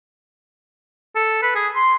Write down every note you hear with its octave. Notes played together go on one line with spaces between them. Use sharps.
A4
B4
G#4
C6